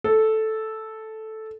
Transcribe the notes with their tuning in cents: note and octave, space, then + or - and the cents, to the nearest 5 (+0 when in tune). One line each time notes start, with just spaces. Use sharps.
A4 -5